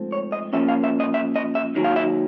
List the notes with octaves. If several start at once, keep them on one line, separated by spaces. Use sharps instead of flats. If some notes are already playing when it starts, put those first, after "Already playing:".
Already playing: G#2 F3 A3 C4
C#5
D#5
A#2 F3 A#3 C#4 E5
F5
E5
D#5
E5
D#5
E5
D#2 D#3 F#3
F5
E5